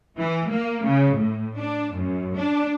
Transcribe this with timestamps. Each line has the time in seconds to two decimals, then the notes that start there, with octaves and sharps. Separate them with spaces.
0.17 E3
0.49 A#3
0.83 C#3
1.14 A2
1.55 D4
1.93 F#2
2.36 D4